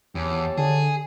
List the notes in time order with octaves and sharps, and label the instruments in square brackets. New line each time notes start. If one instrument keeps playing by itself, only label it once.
[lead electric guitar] E2 [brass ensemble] G4 C#5 A5
[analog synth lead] D3 [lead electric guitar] G#4